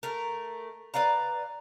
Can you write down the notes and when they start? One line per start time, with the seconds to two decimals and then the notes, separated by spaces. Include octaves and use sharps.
0.03 A3 A#4
0.94 B4 D5 F5 A#5